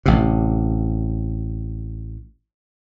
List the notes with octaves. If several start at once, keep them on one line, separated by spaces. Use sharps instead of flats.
A1 C3